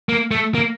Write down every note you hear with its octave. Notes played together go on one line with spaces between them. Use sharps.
A#3
A3
A#3